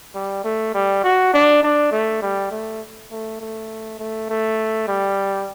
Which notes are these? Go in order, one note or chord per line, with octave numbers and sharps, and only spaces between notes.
G3
A3
G3
F#4
D4
D4
A3
G3
A3
A3
A3
A3
A3
G3